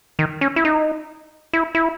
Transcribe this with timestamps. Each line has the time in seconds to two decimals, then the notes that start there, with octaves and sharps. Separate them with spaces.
0.19 D#3
0.41 C#4
0.56 E4
0.65 D#4
1.53 E4
1.75 E4